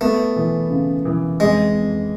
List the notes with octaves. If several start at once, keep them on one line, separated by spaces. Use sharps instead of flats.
A3 B3
E3
C#3
E3
F2 G#3
F2